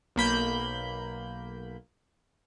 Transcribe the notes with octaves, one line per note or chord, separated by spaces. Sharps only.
B1 A#3 B5 G6